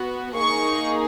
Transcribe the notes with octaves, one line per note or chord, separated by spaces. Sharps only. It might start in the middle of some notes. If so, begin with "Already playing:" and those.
Already playing: B3 F#4
A#3 D#4 G#4 C#6